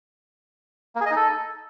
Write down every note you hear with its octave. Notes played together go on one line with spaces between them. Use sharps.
A#3
G#4
D#5
D#4
A4